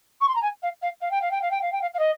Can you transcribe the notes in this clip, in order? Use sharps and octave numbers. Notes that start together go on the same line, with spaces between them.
C#6
C6
A#5
G#5
F5
F5
F5
G5
F5
G5
F5
G5
F5
G5
F5
F5
D#5